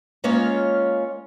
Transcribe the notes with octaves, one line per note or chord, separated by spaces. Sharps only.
G#3 A#3 C#4 F4 C#5 F5